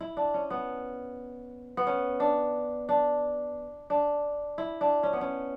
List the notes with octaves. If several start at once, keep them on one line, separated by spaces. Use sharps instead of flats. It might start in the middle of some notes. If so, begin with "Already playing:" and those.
E4
D4
C#4
B3
B3
C#4
D4
D4
D4
E4
D4
C#4
B3
C#4